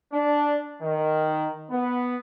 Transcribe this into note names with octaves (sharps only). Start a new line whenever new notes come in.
D4
D#3
B3